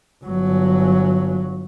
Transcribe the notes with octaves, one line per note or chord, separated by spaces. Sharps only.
G1 F#3